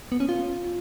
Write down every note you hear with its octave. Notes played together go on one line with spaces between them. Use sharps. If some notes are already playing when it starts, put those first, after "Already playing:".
B3
C#4
F4